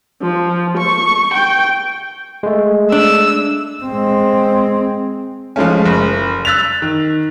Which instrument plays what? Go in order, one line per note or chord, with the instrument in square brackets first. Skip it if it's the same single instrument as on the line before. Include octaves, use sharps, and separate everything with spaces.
[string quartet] F3
C#6
G5
[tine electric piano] G#3 A3
[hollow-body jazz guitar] D4 [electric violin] E6
[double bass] G#3 C4
[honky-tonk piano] F3 G#3 A3 C#4
F#1
E6 F#6 A6 B6 F7
D#3